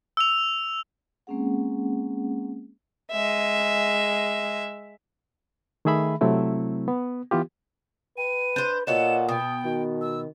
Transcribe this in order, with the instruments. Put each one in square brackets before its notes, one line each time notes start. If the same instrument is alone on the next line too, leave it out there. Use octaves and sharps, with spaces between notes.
[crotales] E6 F7
[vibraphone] G#3 A#3 C4 C#4 G#4 F#5
[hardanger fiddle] G#3 E5
[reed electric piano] D#3 A3 G#4 E5 B5
C3 F#3 A3 C4 E4
B3
E3 B3 F4 G4
[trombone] B4 [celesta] G5 [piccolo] D#7
[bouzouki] D4 C5 [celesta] G6
[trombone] A#2 [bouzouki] B3 F#4 A4 [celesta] C#5 D#5 [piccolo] E7
[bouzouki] B2 [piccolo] G5 [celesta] D#6
[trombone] D#3 [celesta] F#4
[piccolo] E6